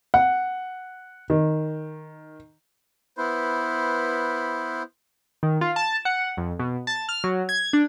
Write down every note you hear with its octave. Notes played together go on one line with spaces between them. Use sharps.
F#5
D#3
B3 E4 B4 C5
D#3
F4
A5
F#5
F2
B2
A5
F6
F#3
G#6
D4